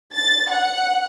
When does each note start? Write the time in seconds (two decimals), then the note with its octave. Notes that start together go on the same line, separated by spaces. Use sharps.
0.13 A6
0.50 F#5